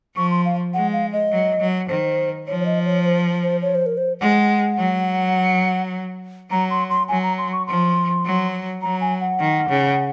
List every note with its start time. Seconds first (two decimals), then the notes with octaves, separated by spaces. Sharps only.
0.16 F3 C#6
0.31 C6
0.45 F5
0.74 G#3 F#5
0.93 F5
1.13 D#5
1.31 F#3
1.60 F#3
1.89 D#3 C5
2.47 F3 C#5
2.60 C#5
2.66 D#5
2.86 C#5
3.04 C5
3.43 C5
3.62 C#5
3.75 C5
3.86 A#4
3.98 C5
4.20 G#3 F#5
4.78 F#3
6.51 F#3 A#5
6.70 C6
6.90 C6
7.09 F#3 G#5
7.23 A#5
7.38 C6
7.53 C#6
7.67 F3 C6
8.25 F#3
8.82 F#3 A#5
9.01 G#5
9.21 F#5
9.40 D#3
9.69 C#3